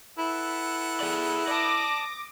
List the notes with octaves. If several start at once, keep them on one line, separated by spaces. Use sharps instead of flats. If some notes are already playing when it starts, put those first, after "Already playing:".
E4 A4 B4 F#5
G#4 D5
D5 A5 D6 D#6 A#6